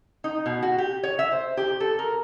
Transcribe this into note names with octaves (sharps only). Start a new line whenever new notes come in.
D#4
B2
F#4
G4
C#5
E5
C5
G4
A4
A#4